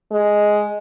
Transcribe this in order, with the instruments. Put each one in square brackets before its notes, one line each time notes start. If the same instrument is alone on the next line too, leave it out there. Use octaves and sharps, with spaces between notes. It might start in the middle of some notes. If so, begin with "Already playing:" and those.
[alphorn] G#3